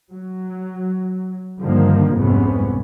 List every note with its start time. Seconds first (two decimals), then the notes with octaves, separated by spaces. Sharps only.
0.11 F#3
1.61 G2 D3 D#3 F3 A#3
2.15 C2 F2 G#2 C3 B3 C#4